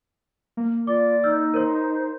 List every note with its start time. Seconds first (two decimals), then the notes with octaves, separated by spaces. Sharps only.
0.57 A#3
0.87 F4 D5 D6
1.24 D#4 E6 F6 G6
1.54 A#4 C5 C#5